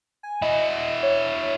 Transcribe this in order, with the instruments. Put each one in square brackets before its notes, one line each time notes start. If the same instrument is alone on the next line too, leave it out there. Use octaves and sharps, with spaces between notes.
[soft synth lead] G#5
[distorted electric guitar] E4 F#4 [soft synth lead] D#5
[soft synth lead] C#5